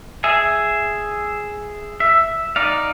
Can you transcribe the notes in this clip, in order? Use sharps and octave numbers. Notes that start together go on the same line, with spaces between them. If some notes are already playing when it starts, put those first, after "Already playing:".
G#4 E5 G#5
E5
D#4 D5 F5